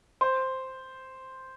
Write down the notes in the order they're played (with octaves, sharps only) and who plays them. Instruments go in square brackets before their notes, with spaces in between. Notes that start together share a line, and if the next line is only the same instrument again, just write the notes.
[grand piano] C5